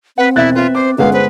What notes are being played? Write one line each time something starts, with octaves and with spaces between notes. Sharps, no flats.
C4 B4 F#5
E1 E4 D5 E5 F#6 A6
F4 B4 E5
C5 D6
G1 G#3 C#4 B4 F5 F#5
B4 C5